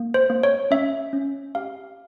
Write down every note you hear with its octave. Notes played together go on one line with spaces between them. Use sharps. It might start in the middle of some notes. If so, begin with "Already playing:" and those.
Already playing: A#3
C5
A#3
C#5
C#4 E5
C#4
G4 F5